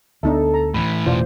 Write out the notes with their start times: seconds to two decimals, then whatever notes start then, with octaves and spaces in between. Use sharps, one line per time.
0.23 D2 B3 D4 D#4 A4 E5
0.54 A#5
0.74 A2 E3 B5
1.06 E1 B2 A3 F4 C5 D5